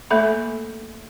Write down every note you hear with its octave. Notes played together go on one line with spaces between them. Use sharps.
A3 A#3 A4 E5 B5